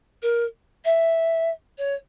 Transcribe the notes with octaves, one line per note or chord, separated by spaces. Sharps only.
A#4
E5
C#5